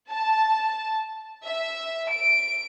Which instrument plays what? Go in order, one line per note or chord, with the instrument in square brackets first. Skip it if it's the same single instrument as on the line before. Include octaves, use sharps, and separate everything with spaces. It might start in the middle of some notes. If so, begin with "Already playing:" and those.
[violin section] A5
E5
D7